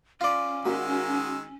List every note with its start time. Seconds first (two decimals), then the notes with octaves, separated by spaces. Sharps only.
0.21 C#4 F4 D5
0.65 D#3 G#3 F#4 A#4 E6